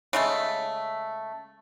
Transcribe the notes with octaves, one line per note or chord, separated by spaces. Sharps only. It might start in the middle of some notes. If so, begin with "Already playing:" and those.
C#3 G#3 A3